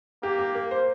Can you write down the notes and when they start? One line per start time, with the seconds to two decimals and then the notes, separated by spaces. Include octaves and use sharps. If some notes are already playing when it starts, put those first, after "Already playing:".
0.23 A#3 G4
0.39 G4
0.55 A#4
0.71 C5